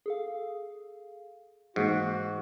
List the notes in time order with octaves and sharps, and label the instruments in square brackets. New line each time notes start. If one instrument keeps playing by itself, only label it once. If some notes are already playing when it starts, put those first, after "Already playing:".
[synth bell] G#4 A4 F5
[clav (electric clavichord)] G#2 [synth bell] E3 A#3 [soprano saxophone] F#4